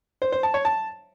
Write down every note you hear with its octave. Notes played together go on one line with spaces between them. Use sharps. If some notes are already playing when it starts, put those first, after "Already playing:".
C5
C5
A5
C#5
A5